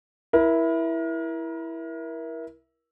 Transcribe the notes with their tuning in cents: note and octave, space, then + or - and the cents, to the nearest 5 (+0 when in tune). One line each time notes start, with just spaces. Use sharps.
E4 +0 A#4 +30